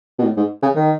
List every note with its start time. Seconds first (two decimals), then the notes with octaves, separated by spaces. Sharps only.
0.19 B2
0.24 A2
0.37 G#2
0.62 C#3
0.75 D#3